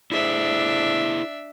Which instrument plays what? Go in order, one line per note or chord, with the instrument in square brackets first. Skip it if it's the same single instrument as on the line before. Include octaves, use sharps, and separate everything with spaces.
[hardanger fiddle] D4 E5 [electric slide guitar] E4 G#4 C5